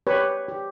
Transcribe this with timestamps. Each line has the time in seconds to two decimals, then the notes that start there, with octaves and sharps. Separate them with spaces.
0.07 G4 B4 C#5
0.48 G4